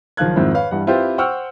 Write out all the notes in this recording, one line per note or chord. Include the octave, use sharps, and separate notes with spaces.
F#1 D#3 F3 F5 F#6 G#6
F2 G#2 D#3 C4 E4
B4 C#5 F5
G2 E3 G3 F#5
C4 E4 F4 G4 B4 C5
C5 F#5 G5 C#6 E6 F6